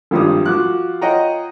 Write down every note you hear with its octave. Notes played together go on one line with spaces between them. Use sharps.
G#1 G2 F3 G3 D#4 D#6
F3 F#4 D6 F#6
F4 C#5 D#5 F#5 G5 A#5